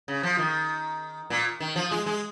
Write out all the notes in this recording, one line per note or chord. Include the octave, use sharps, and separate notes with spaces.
C#3
F3
D#3
A#2
D#3
F3
G#3
G#3